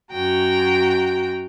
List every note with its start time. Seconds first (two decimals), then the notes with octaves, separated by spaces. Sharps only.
0.12 F#2 F#4 G5 A#5